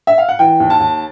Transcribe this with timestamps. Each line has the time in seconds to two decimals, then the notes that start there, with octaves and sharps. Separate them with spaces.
0.07 E5
0.18 F5
0.29 F#5
0.39 E3 G5
0.60 D#2
0.70 A5
0.80 D#2